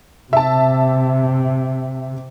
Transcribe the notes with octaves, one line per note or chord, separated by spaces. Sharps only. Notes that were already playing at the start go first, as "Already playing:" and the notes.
C3 E5 A5